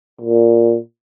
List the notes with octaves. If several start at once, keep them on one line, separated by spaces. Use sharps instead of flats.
A#2